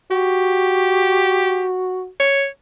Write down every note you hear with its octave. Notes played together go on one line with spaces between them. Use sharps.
F#4 G4
C#5